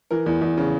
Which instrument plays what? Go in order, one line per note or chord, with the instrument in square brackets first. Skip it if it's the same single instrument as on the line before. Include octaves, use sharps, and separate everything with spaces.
[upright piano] E3 A#4
E2
E2
C#3